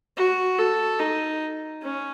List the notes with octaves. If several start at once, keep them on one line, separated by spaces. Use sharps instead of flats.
F#4
A4
D#4
C#4